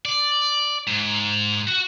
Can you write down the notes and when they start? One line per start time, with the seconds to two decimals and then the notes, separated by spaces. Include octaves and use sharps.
0.05 D5
0.87 G#2
1.67 F#4